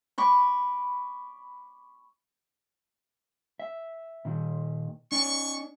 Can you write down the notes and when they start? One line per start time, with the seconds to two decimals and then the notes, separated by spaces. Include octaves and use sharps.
0.18 B5 C#6 D6
3.59 E5
4.25 A#2 D#3
5.12 C#4 D#4 D5 C#6